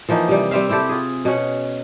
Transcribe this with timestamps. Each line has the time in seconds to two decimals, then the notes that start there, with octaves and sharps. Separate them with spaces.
0.09 E3 F3 A#3 D#4
0.28 C3 G3
0.51 G3 C4 E5 F5
0.69 C4 E4 G4 A4
0.89 F4 G#4
1.25 B2 C#4 F#5